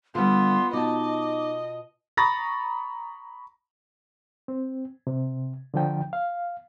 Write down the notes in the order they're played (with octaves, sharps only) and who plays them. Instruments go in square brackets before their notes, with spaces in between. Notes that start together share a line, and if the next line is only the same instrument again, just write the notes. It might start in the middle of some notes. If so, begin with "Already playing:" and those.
[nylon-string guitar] D3 G3 [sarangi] B3 [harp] F4 [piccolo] C6
[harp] B2 A5 [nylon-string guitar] D#4 [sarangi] D#5 [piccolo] D6
[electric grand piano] A#5 B5 C#6 D#6 A6 A#6
[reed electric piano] C4
C3
D3 F3 G5
F5